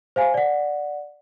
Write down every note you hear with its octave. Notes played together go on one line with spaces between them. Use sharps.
C5 F5 G#5
D5 F#5